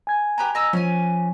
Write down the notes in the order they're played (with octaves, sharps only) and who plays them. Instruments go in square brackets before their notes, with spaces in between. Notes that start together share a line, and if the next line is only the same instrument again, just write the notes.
[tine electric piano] G#5 G#6
[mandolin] G4 B4 A#5
D#5 A#5 E6
[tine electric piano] F3 [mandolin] C#4 G#5